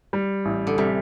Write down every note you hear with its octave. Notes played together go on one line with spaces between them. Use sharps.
G3
A1
D3
C3 G3